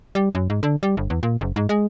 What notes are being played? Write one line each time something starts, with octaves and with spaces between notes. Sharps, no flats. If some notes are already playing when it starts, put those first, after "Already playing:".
G3
F#2
G#2
D3
G3
G1
E2
A#2
F#1
G#2
G#3